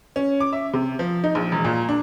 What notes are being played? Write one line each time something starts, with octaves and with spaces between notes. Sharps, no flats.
C#4
D6
E5
C3
F3
D#4
A#1
E1
A#2
D4